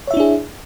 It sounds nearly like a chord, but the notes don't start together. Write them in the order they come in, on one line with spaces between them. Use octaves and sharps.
C#5 E5 E4 D4 G#4